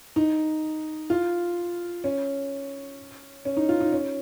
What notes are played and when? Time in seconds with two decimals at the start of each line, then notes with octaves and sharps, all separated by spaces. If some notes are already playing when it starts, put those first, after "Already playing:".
0.16 D#4
1.10 F4
2.04 C#4
3.45 C#4
3.57 D#4
3.69 F4
3.80 D#4
3.92 C#4